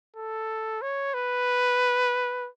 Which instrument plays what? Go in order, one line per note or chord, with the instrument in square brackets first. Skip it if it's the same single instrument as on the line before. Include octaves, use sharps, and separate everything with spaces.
[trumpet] A4
C#5
B4